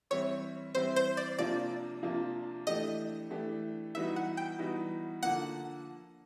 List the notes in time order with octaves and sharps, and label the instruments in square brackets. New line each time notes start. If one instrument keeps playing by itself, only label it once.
[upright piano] E3 G3 C4 E4 [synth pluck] C#5
[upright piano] E3 G3 C4 E4 [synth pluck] C5
[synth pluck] C5
D5
[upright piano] C3 F3 A#3 D4 F4 [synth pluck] D5
[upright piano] C3 F3 A#3 D4 F4
[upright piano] E3 A3 D4 G4 [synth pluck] D#5
[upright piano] E3 A3 D4 G4
[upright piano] E3 G3 B3 D#4 F#4 [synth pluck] E5
[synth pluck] F#5
G5
[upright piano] E3 G3 B3 D#4 F#4
[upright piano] D3 F3 A#3 [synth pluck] F#5